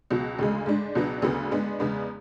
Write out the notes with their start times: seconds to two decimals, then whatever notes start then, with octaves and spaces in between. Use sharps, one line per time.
0.10 C#2 B2 F#3
0.39 D2 C#3 G#3
0.66 G#2 G#3 D4
0.95 C#2 B2 F#3 B3 D4
1.22 D2 C#3 F#3 B3 D4
1.51 G#2 G#3 B3 D4
1.79 E2 C#3 G#3 B3 D4